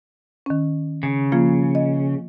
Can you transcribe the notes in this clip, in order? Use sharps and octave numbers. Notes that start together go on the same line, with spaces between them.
D#3 C#4
C#3
F3 A#3 F4
D#5